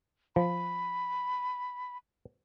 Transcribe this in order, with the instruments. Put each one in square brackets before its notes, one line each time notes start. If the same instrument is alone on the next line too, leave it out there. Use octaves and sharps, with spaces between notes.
[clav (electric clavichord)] F3 [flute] B5